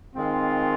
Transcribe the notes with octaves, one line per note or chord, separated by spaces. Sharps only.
D#3 G#3 C4 F4